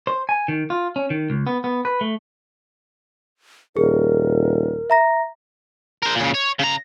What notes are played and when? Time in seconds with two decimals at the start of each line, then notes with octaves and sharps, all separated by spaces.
0.07 C5
0.29 G#5
0.48 D#3
0.70 F4
0.96 C#4
1.10 D#3
1.30 C#2
1.47 B3
1.64 B3
1.85 B4
2.01 A3
3.77 D#1 G#4 A#4
4.90 E5 A#5 A#6
6.03 A#4 C5
6.15 A#2 C#3
6.34 C#5
6.59 C#3 A#5